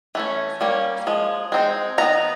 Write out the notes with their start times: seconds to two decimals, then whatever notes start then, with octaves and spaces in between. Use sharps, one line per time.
0.15 E3 A3 C#4
0.61 G3 A#3 C#4
1.07 F3 G#3
1.52 G#3 C4 D#4
1.98 D#3 G#3 B3 D#4 A#5